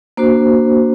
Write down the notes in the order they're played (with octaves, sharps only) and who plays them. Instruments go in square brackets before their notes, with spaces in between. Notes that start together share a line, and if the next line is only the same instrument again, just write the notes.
[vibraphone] A#3 D4 F#4 C5